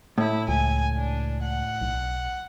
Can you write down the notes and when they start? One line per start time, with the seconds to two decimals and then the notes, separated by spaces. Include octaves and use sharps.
0.18 A2 E4
0.48 C#2 G#5
0.97 D4
1.42 F#5
1.81 B1